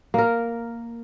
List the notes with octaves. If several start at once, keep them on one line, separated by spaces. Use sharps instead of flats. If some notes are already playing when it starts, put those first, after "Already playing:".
A#3 A#4